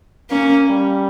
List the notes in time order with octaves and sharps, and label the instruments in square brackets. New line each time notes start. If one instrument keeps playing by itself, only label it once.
[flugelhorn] A#3 [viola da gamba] C#4
[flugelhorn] G3